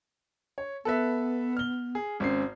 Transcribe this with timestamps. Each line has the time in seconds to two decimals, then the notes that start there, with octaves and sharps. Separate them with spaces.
0.58 C#5
0.85 B3 A4 B4 E5
1.57 F6 G7
1.95 G#4
2.20 G#1 C4 C#4 C7